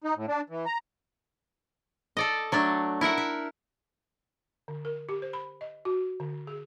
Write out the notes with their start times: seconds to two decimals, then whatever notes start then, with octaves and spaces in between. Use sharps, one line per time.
0.04 D#4
0.16 A2
0.28 D4
0.50 E3
0.66 A#5
2.17 A4 D5 D#5
2.52 F#3 A3 D4
3.01 E4 A#4 E5 F#5
3.18 E5
4.68 D3
4.85 A#4
5.09 G4
5.22 C5
5.33 B5
5.61 D#5
5.85 F#4
6.20 D3
6.47 G#4